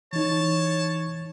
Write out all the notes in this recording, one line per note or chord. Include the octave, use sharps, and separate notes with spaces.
E3 D#4 C#5 A5